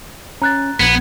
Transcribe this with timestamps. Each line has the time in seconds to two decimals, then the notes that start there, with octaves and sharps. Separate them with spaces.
0.42 C#4 A#5 F#6 A6
0.80 A#1 B3 G#6